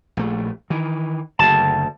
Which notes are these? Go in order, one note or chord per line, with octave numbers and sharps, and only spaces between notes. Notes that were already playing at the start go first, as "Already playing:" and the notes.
A#1 A3
D#3 E3
F#1 D2 A5